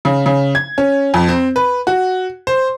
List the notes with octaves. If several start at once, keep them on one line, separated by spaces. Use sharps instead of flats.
C#3
C#3
G#6
C#4
F2
C4
B4
F#4
C5